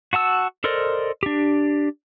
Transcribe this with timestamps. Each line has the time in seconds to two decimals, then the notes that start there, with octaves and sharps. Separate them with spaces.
0.13 F#4 F#5 A5 E6
0.64 A4 A#4 C5 D5 D#5
1.23 D4 G4